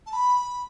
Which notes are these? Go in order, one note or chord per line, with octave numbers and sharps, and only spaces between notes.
A5
B5